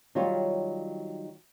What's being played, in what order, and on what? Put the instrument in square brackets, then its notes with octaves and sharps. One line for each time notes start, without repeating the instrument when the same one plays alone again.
[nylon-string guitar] D#3 F#3 G3 F4 C#5